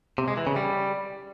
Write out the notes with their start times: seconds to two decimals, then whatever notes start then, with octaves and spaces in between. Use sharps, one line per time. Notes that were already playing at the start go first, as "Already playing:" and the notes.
0.18 C3
0.28 G#3
0.37 E3
0.47 C#3
0.56 G3